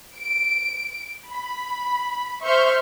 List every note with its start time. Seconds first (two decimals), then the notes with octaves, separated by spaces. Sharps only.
0.17 D7
1.29 B5
2.43 C5 E5 C#6 F6 G6